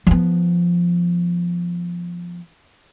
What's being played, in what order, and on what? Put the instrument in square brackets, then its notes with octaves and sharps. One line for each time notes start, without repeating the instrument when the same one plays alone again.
[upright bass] F3 B3